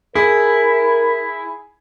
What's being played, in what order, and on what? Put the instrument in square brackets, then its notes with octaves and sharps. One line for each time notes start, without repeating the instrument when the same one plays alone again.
[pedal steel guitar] E4 [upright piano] G#4 [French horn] A#4